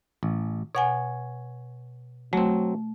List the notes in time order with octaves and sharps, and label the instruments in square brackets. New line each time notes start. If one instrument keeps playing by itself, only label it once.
[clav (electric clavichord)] A1
[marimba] B2 F#5 G#5 [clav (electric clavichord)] C#5
[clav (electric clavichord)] F#3 C4 [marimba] A3